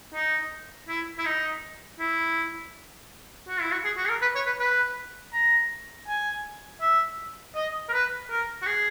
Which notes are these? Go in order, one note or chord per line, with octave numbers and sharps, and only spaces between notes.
D#4
E4
E4
D#4
E4
F#4
E4
F#4
G#4
F#4
G#4
A#4
B4
C#5
B4
B4
A#5
G#5
E5
D#5
A#4
B4
A#4
F#4
G#4